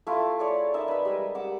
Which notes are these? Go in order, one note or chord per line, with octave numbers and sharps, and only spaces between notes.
A3 E4 F4
G#4 A4 C#5 D5
D#4 A#4 D5 E5
B4 B5
G3 G#3 A#4 D#5
F#5 D6 E6